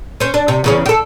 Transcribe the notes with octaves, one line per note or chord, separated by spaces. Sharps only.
C#4 C5
D4
C3
E2 C#3 C#4
G4 A4